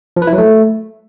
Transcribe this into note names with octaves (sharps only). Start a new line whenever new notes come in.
F3
B4
E4
F#3
A3